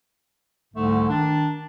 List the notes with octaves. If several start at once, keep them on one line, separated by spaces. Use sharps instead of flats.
C2 G#2 D3 A3
D#3 D4